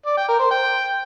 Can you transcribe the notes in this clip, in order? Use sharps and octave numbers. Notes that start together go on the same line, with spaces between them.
D5
G5
A#4
C5
G5